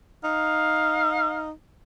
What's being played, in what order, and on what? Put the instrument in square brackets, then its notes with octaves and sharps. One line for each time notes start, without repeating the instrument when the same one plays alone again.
[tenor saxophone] D#4 [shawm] F5